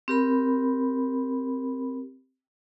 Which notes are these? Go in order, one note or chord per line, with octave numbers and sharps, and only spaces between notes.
C4 G4 A#4 B5